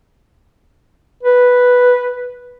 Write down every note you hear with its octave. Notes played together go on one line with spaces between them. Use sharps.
B4